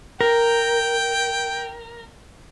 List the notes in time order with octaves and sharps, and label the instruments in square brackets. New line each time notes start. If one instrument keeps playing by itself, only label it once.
[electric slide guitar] A#4 [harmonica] G5